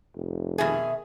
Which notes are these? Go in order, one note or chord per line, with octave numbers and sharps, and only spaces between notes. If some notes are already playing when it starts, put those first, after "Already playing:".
F1
B2 D#3 G#4 E5